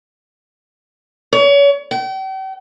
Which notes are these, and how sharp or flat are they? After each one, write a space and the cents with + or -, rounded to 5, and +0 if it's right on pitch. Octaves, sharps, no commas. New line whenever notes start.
C#5 +35
G5 -40